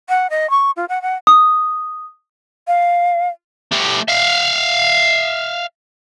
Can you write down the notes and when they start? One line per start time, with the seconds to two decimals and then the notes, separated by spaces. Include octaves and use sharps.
0.09 F#5
0.30 D#5
0.50 C#6
0.76 F4
0.89 F#5
1.02 F#5
1.27 D#6
2.68 F5
3.72 A3 G4
4.08 E5 F5